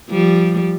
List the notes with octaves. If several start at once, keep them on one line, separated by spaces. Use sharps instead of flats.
F3 G3